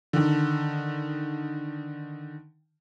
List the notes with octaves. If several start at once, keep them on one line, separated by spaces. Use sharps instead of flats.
D3 D#3